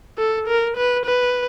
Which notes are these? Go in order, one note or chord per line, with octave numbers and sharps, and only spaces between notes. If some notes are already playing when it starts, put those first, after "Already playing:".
A4
A#4
B4
B4